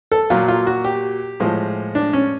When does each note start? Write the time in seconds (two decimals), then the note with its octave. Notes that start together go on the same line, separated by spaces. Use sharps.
0.12 A4
0.30 A#2 F#3 F4
0.48 F4
0.67 F#4
0.85 G4
1.40 A2 F3 G#3
1.95 D4
2.13 C#4